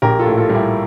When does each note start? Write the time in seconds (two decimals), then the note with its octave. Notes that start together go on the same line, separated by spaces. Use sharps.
0.02 A#1 G4 A#4
0.19 F4 A4
0.26 A2
0.38 F4 A4
0.49 G3 F4
0.55 E4 G4